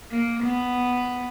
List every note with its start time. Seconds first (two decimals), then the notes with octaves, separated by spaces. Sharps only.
0.12 A#3
0.45 B3